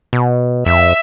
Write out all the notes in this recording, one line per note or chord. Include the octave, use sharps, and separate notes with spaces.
B2
F2 E5